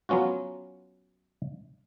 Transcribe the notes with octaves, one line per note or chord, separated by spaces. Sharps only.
F#3 B3 C#4 F4 F#4